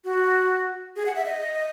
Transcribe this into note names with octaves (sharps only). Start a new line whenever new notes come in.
F#4
G#4
F#5
E5
D#5